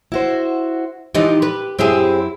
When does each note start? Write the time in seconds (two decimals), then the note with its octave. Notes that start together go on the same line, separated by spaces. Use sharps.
0.12 E4 F#4 C5
1.15 E3 F3 D#4 G4
1.42 B4
1.79 F#2 C4 E4 G4 G#4